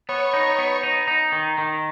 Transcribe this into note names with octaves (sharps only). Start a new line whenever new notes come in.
B3 C#5
D#4
B3
D#4
D#4
D#3
D#3